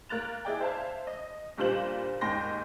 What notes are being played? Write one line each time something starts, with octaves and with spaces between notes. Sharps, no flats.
A#3 F#6 A6 F7
E4 G#4 D5 G5
C5 E5 F5 A5 G#6
D#5
A#2 G3 D4 F4 C5 F#7
D#2 G#2 G5 C6 A#6